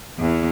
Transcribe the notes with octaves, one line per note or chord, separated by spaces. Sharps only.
E2 E3